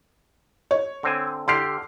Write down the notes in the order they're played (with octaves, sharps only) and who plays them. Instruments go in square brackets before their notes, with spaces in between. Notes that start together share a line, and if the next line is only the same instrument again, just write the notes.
[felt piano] C#5
[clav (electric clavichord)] D3 C4 G#5
[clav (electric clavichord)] D3 G4 [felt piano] C6 F6 C7